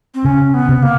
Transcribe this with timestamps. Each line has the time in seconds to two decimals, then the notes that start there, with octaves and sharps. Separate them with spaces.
0.15 C4
0.25 C#3 C#4
0.54 B3
0.69 C3
0.83 A#3